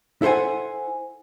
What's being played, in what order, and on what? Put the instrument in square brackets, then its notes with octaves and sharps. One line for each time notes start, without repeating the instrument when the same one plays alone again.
[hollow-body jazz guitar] E4 A4 C5 F#5 G#5